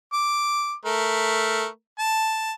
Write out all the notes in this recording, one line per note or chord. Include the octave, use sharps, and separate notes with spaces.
D6
A3 A#4
A5